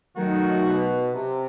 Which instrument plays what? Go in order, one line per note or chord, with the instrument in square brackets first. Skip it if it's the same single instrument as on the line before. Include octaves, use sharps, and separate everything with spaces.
[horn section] D#3 [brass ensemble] F#3 A3 D#4 F#4
[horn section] B2
C3